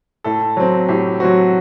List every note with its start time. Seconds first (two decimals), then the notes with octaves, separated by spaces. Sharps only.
0.24 A2 A4
0.57 F#3 C4
0.88 A2 G4
1.20 F#3 C4 F#4